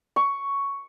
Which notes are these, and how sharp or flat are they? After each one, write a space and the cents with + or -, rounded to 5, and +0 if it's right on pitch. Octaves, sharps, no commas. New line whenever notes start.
C#6 +5